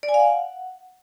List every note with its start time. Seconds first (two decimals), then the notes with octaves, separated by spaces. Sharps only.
0.03 D5
0.09 G#5
0.14 F5
0.20 F#5